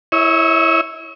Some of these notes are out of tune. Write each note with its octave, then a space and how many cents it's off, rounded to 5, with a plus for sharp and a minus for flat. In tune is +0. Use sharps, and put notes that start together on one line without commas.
E4 +0 C#5 +0 E5 -45